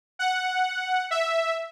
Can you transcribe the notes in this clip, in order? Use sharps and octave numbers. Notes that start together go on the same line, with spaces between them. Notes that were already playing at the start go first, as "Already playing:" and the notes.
F#5
E5